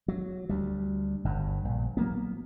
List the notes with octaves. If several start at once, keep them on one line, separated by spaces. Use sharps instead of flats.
F#3
D2 G3
G1 G2
A#1
F#3 A#3 B3